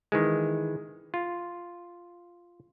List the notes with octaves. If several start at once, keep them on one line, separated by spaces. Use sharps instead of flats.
D#3 E3 G#3
F4